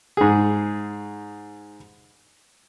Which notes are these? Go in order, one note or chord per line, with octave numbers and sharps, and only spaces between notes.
G#2 G#4